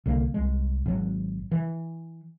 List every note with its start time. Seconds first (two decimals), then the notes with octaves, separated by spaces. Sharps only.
0.06 C2 D3 G3 A#3
0.34 C2 G#3
0.86 G#1 F#3
1.52 E3